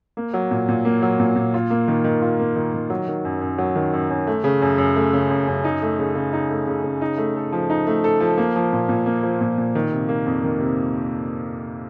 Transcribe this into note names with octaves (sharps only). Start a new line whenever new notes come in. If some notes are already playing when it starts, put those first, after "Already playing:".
A#3
F#3
A#2
A#2
A#3
F#3
A#2
A#2
F4
A#3
D#3
D#3
F4
A#3
D#3
D#3
F#3
D#3
F#2
F#2
F#3
D#3
F#2
F#2
A3
C#3
F#2
F#2
A3
C#3
F#2
F#2
D#4
A3
C#3
C#3
D#4
A3
C#3
C#3
D#4
A3
A4
F3
D#4
A3
A4
F3
A#3
F3
A#2
A#2
A#3
F3
A#2
A#2
D#3
C3
A#3
F2
D#3
C3